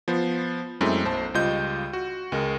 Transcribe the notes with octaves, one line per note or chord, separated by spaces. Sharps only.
F3 B3 C5
F#2 G#3 A3 C4 E4
B1 C5 A5
C#2 G3 F4 D#5 G6
F#4
C#2 G#3 A#4